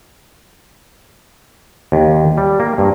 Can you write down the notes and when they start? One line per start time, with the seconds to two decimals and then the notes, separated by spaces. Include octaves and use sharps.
1.92 D#2
2.37 G3
2.60 A#3
2.78 G2